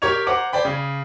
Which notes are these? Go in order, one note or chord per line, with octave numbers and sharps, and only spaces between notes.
G4 A#4 C#5 C#6 G#6 F7
C5 F#5 A#5 D6
C5 D5 G5 B5
C#3